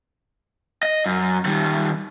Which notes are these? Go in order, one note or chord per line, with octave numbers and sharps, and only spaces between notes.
D#5
F#2
D#3 G3